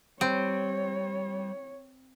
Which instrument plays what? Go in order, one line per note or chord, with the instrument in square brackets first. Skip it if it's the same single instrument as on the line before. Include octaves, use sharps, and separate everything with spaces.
[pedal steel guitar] G3 [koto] C4 [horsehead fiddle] C#5